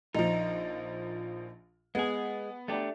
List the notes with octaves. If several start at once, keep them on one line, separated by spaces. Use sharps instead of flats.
A#1 F3 D#4
G#3 B3 G#4
A3 D4 G4